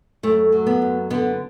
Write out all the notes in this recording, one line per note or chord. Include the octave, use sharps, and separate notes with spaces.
F#2 A3
F#3
B3
F#2
D3 B3